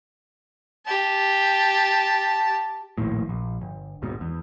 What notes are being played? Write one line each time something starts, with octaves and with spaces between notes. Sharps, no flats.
G4 A5
A#1 D#2 A2
A#1
G1
G#1 D#2 G#2 B2
E2